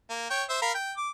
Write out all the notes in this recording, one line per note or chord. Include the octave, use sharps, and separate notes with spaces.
A#3
C#5 G5
C5 E5
A#4 F5 B5
G5
D6